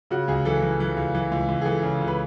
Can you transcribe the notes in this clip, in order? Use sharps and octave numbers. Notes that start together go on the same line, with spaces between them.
C#3 F#4
C#2 G#4
E3 A4
E3
E3
C#2
E3
C#2
C#2
G#4
E3 A4
C#3
C#2
B4